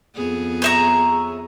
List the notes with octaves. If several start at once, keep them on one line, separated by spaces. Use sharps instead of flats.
F2 B3 G#4
C#5 E5 A#5